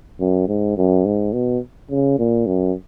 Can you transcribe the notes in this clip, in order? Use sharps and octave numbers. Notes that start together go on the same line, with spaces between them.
F#2
G#2
F#2
G#2
B2
C#3
A#2
F#2